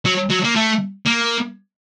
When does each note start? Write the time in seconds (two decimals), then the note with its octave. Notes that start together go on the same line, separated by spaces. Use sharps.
0.05 F#3
0.30 F#3
0.44 A#3
0.56 A3
1.06 A#3